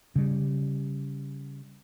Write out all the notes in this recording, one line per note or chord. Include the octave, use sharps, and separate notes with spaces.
C#3 G3